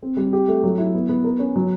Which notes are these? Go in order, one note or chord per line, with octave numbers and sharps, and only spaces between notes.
C4
G3
G4
A3
F#3
E4
B3
B3
A#4
C#4
F#3